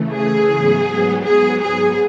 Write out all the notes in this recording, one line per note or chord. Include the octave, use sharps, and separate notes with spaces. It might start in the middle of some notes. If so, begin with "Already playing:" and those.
Already playing: C#3 E3 A3
G#4
G#2 F#3 B3
G#4
G#4